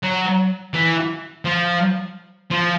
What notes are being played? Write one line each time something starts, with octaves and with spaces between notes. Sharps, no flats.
F#3
E3
F3
F3